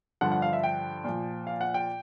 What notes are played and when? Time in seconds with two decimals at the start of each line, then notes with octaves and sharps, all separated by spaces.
0.21 G2 D3 F3 F#5
0.32 F#5
0.42 F5
0.53 E5
0.64 G5
1.04 A#2 F3
1.47 F5
1.61 F#5
1.74 G5